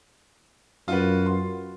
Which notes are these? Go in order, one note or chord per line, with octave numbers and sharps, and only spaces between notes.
F#2 F4 F#4 B4
C6